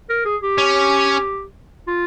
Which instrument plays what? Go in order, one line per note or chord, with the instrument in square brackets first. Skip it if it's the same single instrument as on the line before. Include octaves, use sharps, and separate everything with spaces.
[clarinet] A#4
G#4
G4
[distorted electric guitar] C#4
[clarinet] F4